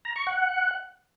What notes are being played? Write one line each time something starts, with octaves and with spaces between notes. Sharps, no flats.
A#5
C#6
F#5